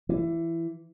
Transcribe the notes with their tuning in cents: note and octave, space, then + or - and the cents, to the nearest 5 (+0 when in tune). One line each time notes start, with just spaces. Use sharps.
E3 +15